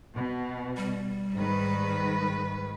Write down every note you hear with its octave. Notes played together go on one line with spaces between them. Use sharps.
B2
G3
G#2 D#3 B4